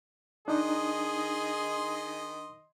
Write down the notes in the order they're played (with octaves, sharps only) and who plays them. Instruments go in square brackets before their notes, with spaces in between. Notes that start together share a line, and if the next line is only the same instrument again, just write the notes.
[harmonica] D#3 D#5 C6 [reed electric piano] D4 D#4 [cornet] G#4